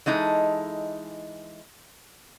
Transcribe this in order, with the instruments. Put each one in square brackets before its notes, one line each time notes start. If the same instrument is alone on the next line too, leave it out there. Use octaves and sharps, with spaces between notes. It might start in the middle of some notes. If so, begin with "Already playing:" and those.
[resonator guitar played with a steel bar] E3 G#3 D#4 A4